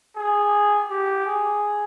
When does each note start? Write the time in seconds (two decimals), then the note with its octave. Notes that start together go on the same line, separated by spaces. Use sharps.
0.16 G#4
0.90 G4
1.26 G#4